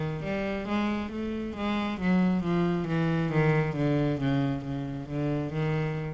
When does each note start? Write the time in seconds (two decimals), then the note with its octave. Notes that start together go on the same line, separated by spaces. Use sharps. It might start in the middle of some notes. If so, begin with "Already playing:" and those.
Already playing: D#3
0.24 G3
0.68 G#3
1.12 A3
1.56 G#3
2.01 F#3
2.44 F3
2.88 E3
3.33 D#3
3.76 D3
4.20 C#3
4.65 C#3
5.09 D3
5.53 D#3